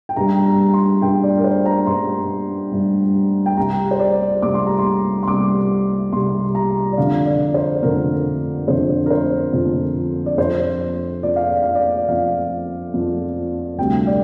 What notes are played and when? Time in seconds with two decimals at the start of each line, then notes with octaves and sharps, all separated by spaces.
0.09 G5
0.16 G2 G3 A#5
0.45 A#5
0.74 C6
1.02 G2 G3 G5
1.23 D5
1.37 A#4
1.44 C5
1.66 A#5
1.87 G2 G3 C6
2.72 G2 G3
3.46 G5
3.57 C2 C3 G3 A#5
3.91 C5
4.00 D5
4.42 C2 C3 G3 D6
4.54 C6
4.67 A#5
4.79 C6
5.23 C6
5.27 C2 C3 G3 D6
6.12 C2 C3 G3 C6
6.55 A#5
6.92 D5
6.97 F2 D3 F3 F5
7.26 D5
7.54 C5
7.82 F2 D3 F3 A#4
8.68 F2 D3 F3 C5
9.06 A#4
9.11 C5
9.53 F2 D3 F3
10.26 D5
10.37 F2 F3 C5
11.23 F2 F3 D5
11.36 F5
11.49 D5
11.62 F5
11.75 D5
12.08 F2 F3 F5
12.93 F2 F3
13.78 D2 C3 G3 G5
14.07 D5